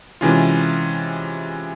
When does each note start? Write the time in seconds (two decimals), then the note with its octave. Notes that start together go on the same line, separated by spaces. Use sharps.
0.21 C3 E3 G#3 C#4 F4